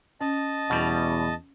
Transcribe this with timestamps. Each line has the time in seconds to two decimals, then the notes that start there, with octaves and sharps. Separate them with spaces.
0.21 C#4 D#5 A5
0.70 E2 B2 G3